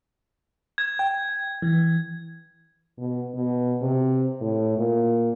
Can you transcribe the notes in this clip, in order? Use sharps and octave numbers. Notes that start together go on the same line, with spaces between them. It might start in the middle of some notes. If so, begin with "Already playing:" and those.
G#6
G5
E3
B2
B2
C3
A2
A#2